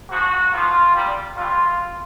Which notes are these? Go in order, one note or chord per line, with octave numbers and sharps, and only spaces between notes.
G#2 F3 F#4
G#2 F3 F4
A#2 G3
A2 E3 G3 F4